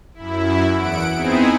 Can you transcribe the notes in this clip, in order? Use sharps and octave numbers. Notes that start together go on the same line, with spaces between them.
F#2 E4
E2 F#5 D7
B3 C4 D#4 E4 G#4